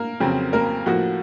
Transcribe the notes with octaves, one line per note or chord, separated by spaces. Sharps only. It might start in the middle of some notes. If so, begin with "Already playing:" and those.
Already playing: A#3 A#4
F2 C#3 F#3 C4
A#3 A#4
A2 F3 A#3 F#4